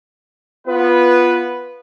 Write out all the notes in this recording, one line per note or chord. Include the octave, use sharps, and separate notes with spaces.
B3 F4 B4